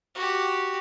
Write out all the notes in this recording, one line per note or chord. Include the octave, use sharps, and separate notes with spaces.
F#4 G4